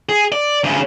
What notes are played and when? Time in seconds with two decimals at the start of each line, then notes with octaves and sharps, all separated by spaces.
0.09 G#4
0.32 D5
0.64 D2 C#3